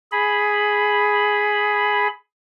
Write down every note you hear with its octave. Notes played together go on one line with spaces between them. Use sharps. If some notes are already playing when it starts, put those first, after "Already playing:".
G#4 B5